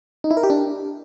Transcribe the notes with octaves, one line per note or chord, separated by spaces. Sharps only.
D#4
E4
A#4
G4
D4